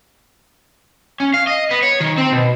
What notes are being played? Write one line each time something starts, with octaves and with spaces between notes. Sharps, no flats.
C#4
F5
D#5
B3
C#5
D#3
C4
B2